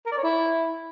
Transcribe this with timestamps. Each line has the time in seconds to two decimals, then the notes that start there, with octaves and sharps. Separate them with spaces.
0.06 A#4
0.12 D5
0.17 C#5
0.23 E4